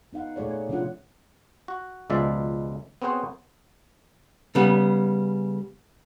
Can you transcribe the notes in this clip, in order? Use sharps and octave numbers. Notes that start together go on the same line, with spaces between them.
B3 D#4 F5 F#5
A#2 A3 G#4 C#5 D5
C#5
C3 F3 C#4 D4 F4 F#5
F#4
C#2 B2 F3 G#3 D5 E5
B3 C4 F#4 G#4 C5 C#5
C#3 G3 B3